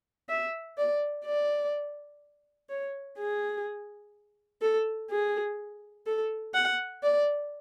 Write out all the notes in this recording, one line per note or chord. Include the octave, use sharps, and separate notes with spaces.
E5
D5
D5
C#5
G#4
A4
G#4
A4
F#5
D5